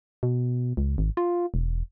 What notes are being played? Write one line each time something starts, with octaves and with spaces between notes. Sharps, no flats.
B2
C#2
G#1
F4
E1